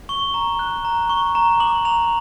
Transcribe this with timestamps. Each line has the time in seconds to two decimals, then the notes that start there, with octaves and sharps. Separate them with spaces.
0.09 C#6 G7
0.34 A#5
0.59 F#6
0.85 A#5
1.10 C#6
1.35 A#5
1.60 D6 F#7
1.85 A#5 F7